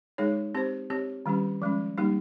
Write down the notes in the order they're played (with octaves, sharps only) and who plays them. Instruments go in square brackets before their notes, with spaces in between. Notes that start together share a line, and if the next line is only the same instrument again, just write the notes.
[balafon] G#3 D#4 G#4 C#5
C4 G4 C5
C4 G4 C#5
D#3 G3 C#4 G4
F3 G#3 C#4
G3 A#3 D#4 G4